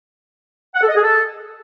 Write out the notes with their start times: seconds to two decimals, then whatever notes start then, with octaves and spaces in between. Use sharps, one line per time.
0.75 F#5
0.82 A4
0.88 D#5
0.95 G#4
1.02 A4